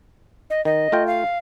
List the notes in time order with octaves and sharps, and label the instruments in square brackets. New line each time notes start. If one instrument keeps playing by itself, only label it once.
[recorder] D#5
[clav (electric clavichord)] D#3 [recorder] D#5
[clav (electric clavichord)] A3 F4 G5
[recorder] F5